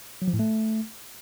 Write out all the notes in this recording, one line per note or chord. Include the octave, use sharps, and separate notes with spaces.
F#3
F3
A2
A3